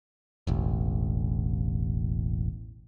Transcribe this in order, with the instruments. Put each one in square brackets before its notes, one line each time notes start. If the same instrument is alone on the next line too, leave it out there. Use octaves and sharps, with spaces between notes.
[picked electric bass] E1 A1